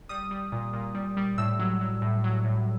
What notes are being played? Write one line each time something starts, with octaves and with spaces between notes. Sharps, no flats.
G3 D#6
G3
A#2
A#2
G3
G3
A2 E6
F#3
F#3
A2
F#3
A2